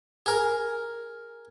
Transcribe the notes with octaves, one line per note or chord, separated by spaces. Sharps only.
G#4 A#4